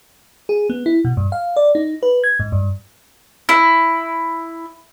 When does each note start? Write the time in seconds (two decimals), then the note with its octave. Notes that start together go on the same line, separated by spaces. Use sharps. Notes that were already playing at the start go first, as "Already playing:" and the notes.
0.49 G#4
0.70 B3
0.86 E4
1.05 B2
1.17 G2
1.32 F5
1.56 D5
1.75 D#4
2.03 B4
2.24 G#6
2.40 G#2
2.52 G2
3.49 E4